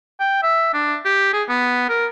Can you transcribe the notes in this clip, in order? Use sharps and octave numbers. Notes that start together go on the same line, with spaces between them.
G5
E5
D4
G4
G#4
B3
A#4